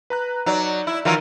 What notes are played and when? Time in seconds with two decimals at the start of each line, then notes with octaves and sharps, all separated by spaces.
0.10 B4 A#5 F#6
0.46 F#3 D#4 D5
0.87 E4
1.05 D#3 E3 F#3 F4